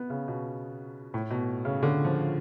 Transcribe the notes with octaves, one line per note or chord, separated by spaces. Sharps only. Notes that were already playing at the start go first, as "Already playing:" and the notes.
Already playing: B3
C#3
B2
A2
B2
C#3
D3
F3